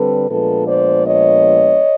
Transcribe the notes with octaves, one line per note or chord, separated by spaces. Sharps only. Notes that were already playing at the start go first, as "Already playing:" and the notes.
Already playing: D3 G3 C4 A4 B4
A#2 F3 G#3 B3 D4 A4 B4
C5 D5
C#5 D#5